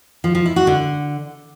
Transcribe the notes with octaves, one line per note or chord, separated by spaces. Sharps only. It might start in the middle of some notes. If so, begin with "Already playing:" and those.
F3
F3
E4
F#4
D3